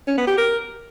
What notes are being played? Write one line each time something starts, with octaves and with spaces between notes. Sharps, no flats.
C#4
B3
G4
A#4